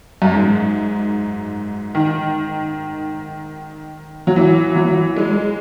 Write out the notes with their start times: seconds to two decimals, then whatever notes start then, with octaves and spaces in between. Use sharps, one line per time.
0.22 F#2
0.33 G#2
1.95 D#3
4.27 F#3
4.36 E3
4.75 F#3
5.16 G#3